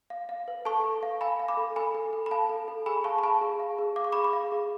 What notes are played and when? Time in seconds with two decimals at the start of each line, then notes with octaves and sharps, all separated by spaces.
0.10 F5
0.29 F5
0.48 B4
0.65 A4 A5 C#6
0.84 A4
1.03 F5
1.21 F5 G#5 B5
1.40 F5
1.48 B5 D6
1.57 A4
1.76 A4 G#5 B5
1.95 A4
2.13 A4
2.26 B5
2.31 F5 A5
2.50 A4
2.68 A4
2.86 G#4 G#5 B5
3.04 F5 A5 C#6
3.18 B5
3.23 F5 A5 C#6
3.41 G#4
3.60 F5
3.78 G#4
3.96 F5 D6
4.04 C#6
4.12 G#4 B5 D6
4.24 B5 D6
4.33 F5
4.52 G#4